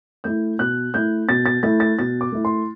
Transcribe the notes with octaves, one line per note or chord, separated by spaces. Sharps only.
A3 E4 G6
B2 F#6
A3 E4 G6
B2 A6
A6
A3 E4 A6
A6
B2 A6
D6
A3 E4
C6